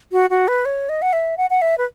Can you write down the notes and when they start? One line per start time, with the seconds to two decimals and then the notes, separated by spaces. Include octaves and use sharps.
0.12 F#4
0.30 F#4
0.48 B4
0.65 C#5
0.89 D#5
1.02 F#5
1.13 E5
1.37 F#5
1.50 F#5
1.61 E5
1.78 B4